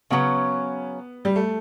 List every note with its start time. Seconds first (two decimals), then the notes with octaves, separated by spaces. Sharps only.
0.10 C#3 F#3 B3 C#4
1.25 G3
1.36 A3